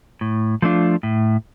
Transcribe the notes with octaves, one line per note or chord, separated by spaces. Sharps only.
A2
F3 A3 D4 F4
A2